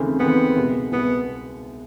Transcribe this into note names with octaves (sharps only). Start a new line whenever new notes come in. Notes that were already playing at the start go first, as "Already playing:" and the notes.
Already playing: D#2 C#3 E3 A3 C4
D#2 C#3 E3 A3 B3 C4
C2 B2 G#3
C2 B2 G#3 B3